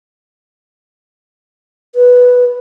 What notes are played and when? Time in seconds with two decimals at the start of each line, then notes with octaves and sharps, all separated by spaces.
1.95 B4